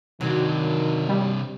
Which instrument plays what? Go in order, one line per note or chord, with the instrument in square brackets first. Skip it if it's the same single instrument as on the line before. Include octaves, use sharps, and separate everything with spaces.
[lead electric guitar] C3 D4 [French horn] D#3 [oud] F#3
[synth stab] G3